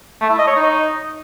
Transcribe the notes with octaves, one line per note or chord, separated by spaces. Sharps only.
A3
E4
D#5
C#5
D#4